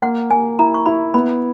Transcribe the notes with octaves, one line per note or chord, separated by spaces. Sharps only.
A#3 F#5
A#3 G#5
E4 A#5
C#6
E4 B5
B3 B5